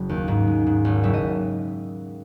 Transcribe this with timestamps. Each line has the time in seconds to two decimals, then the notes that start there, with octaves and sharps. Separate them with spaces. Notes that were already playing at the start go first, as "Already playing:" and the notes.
Already playing: F#1
0.09 D#2
0.28 G#2
0.47 G#3
0.66 G#2
0.85 G#1
1.03 F#1 E5
1.13 D#5